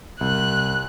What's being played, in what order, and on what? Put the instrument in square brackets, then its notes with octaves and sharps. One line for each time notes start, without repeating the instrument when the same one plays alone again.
[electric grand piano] C2 [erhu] F#6